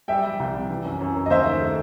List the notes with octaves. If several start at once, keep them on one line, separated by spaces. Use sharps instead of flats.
G3 E5 G5
G3
C2
C3
E3
F#2
F#2
F#2
D#5
D#2 C5 E5
D#3
A3